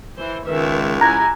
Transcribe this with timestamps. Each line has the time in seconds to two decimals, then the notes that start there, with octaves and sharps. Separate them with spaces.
0.18 E3 C5
0.47 C#2 D#3 G#3 B4 E5
1.01 E4 G4 G#5 A#5 F#6 G#6 A#6